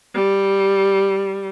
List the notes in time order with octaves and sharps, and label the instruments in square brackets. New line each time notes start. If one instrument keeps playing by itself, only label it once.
[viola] G3